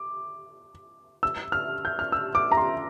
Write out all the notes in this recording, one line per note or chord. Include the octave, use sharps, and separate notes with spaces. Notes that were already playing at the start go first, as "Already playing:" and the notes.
Already playing: D6
E6
F6
G6
F6
E6
D6
A#5
C6